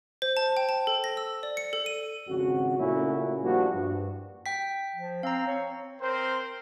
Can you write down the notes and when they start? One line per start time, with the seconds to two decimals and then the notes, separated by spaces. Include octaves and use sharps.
0.22 C5
0.37 A5
0.57 G5
0.69 A5
0.87 A4
1.04 A#6
1.17 E6
1.43 D5
1.57 C#7
1.73 A4
1.86 D#7
2.29 G#1 F2 C#3 F#4
2.78 A#2 C#3 A3 C#4 E4 F#4
3.43 F3 G3 A#3 D4 F#4
3.74 G2
4.46 G5 B6
4.96 F3
5.23 C4 F5 A#5
5.47 C#5
6.01 C4 A#4 C5